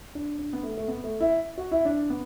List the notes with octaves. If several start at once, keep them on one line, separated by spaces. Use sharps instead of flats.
D4
D4
B3
A3
A3
B3
A3
E4
F#4
E4
D4
B3